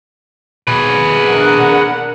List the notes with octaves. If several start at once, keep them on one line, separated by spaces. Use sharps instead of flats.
B2 G#4 B4
D4 A#4 F#5